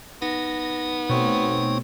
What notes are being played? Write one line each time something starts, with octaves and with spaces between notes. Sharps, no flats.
B3 D#4 A#6
B2 A3 C4 C#5